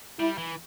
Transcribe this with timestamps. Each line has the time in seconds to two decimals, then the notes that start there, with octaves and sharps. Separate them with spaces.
0.19 G3 E4
0.38 E3